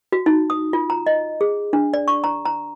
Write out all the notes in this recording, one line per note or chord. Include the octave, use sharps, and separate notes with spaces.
F#4
D#4
D#6
F4
A#5
D#5
G#4
D4
D5
C#6
A#5
A#5